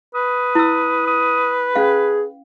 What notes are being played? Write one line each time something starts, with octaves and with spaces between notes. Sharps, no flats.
B4 D#6
E4 E6
D#6
C#4 G#4 F5